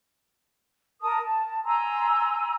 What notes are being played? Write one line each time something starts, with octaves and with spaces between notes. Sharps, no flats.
A#4 A5 D#6
A5
G#5 A#5 C6 E6